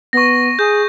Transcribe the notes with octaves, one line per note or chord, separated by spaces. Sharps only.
B3 C#6 A#6
G#4 G6